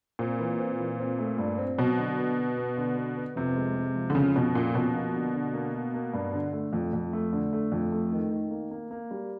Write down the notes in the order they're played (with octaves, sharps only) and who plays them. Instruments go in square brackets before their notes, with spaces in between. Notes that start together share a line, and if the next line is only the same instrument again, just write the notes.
[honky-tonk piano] A#2 [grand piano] C4
[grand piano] E3
C4
E3
C4
A3
G2
C4
[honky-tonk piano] B2 [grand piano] F#3
[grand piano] D3
B3
B3
B3
D3
B3
B3
[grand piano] F2 [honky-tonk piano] C3
[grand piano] G#3
G#3
F3
[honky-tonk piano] D3
[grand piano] F2 [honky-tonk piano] C#3
[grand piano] F2 [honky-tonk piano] B2
[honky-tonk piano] A#2 [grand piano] C#3
[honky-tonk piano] B2 [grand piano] F3
[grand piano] A#3
D3
D3
A#3
A#3
A#3
G2
D3
A3
F2
F2
A3
D3
A3
F2
A3
D#3
D#3
A#3
A#3
A#3
G3